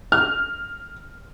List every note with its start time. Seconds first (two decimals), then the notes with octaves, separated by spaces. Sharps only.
0.12 F6